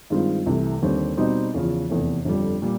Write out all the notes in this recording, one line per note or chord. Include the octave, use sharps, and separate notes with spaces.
G2 D#3 G#3 C4 F4
C2 C3 E3 A3
D#2 D3 G3 C4
B2 G3 C4 D#4
E2 C#3 F3
F1 E2 C3
G1 F2 D3 G3
A#2 G3